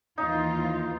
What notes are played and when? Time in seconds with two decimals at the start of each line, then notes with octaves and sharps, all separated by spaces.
0.18 D#2 E3 D#4 F4